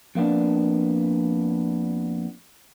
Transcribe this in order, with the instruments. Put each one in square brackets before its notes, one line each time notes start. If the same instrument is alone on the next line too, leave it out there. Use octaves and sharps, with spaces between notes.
[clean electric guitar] F2 A#3 B3 D4